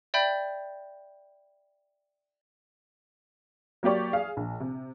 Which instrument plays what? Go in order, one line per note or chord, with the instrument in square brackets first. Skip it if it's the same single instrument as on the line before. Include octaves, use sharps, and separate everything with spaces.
[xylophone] D5 E5 G5 B5 G6
[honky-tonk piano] F#3 A#3 G4 D5 C#6
G#4 F5
A#1
C3